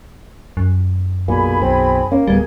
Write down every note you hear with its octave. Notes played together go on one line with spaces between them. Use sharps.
F#2
B1 A#2 A#3 G#4 G#5 B5
B1 C4
A#3 C#4
D1 G3 B3 G#4 G#5 G#6